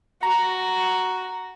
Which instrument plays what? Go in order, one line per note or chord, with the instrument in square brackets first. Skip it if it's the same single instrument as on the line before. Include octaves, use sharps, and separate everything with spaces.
[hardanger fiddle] F#4 [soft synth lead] A#5